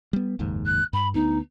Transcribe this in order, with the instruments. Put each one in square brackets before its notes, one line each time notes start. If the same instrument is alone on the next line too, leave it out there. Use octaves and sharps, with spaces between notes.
[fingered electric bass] G3 B3
F#1 D#2 G#2
[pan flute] F#6
[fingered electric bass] G2 [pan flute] B5
[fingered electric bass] D2 B3 [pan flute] D#4